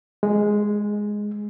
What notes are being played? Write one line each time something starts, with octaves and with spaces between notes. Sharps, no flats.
G#3